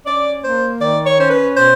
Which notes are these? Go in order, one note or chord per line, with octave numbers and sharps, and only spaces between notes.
C#4 D5
A#3 C5
D#3 D5
C#5
C#4 C5
B4
B2 C5